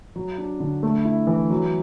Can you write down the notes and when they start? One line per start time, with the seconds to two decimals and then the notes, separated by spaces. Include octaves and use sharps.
0.16 F#3
0.38 D4
0.60 D3
0.83 A3
1.05 E4
1.27 E3
1.50 F#3